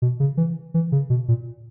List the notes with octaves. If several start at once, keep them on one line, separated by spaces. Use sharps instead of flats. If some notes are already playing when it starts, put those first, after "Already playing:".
B2
C#3
E3
E3
C#3
B2
A#2